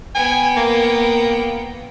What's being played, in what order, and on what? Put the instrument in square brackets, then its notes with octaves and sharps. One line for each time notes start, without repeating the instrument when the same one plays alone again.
[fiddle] B3 G5 [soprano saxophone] G#5
[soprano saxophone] A#3